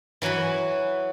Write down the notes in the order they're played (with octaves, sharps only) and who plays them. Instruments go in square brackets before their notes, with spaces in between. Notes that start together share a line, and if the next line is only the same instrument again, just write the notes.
[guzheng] E3 F#3 F#4 G#5 B5